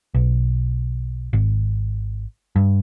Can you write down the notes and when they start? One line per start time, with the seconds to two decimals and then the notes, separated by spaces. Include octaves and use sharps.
0.14 B1
1.33 G#1
2.56 G2